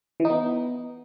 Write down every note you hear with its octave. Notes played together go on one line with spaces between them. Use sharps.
E3
D#4
B3